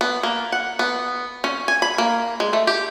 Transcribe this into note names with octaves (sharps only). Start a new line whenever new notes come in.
B3
A#3
F#5
B3
C#4
G#5
B5
A#3
G#3
A3
G4